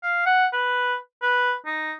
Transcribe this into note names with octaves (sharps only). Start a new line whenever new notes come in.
F5
F#5
B4
B4
D#4